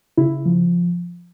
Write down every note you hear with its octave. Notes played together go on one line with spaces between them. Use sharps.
C#3 E4
F3